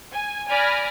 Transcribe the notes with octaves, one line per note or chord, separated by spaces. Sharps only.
G#5
D5 G#5 B5 F6 A#6